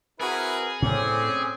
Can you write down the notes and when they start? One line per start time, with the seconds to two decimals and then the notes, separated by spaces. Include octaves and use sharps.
0.20 C4 E4 F#4 G#4 A#4 B4
0.82 A2 C4 C#4 D5